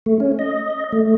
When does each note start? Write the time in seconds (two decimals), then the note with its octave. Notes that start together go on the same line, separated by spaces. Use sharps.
0.06 A3
0.20 C#4
0.39 D#5
0.93 A3